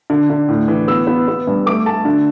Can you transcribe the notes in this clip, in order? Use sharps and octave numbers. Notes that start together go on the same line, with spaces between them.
D3
D3
A2
E3
B3 E6
B3
B3
G2
A3 D6
A3 A5
D3